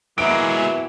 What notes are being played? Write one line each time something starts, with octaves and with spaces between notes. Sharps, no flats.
B2 E3 F#3 G#3 A#3 E4 D7